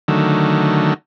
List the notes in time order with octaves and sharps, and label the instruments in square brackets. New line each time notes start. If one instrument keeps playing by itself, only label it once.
[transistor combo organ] D3 D#3 F#3 A3